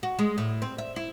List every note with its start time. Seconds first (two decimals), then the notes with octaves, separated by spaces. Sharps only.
0.03 F#4
0.19 G#3
0.38 A2
0.62 C4
0.78 E5
0.96 E4